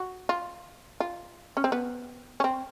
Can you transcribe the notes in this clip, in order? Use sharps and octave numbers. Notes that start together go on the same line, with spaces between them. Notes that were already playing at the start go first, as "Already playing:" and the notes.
Already playing: F#4
F4
F4
C#4
C4
B3
C#4
C4